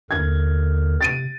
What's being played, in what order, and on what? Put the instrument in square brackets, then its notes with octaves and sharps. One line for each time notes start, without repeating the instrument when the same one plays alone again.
[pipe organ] D#2 D3 A#4 [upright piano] G#6
[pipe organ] C3 [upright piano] A6 D7 D#7